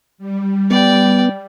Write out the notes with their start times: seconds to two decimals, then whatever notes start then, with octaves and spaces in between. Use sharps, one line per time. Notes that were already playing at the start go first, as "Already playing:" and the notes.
0.18 G3
0.70 B3 D5 G5